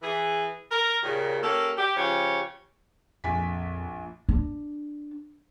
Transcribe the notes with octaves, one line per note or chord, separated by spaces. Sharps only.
E3 G#4
A#4
D#2 A#2 C#3
A#3 C#4 G4 A4
G4
C#3 F3 G4 C#5
A#1 F2 G#5 B6
D4